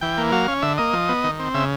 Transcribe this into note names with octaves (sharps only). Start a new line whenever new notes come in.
E3 G5
A#3
F#3 F5
C#4
D3 E5
A#3 D#5
F3
B3
D#3
C4
C#3 E5